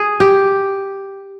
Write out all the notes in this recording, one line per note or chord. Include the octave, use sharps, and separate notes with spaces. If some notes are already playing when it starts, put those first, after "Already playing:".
Already playing: G#4
G4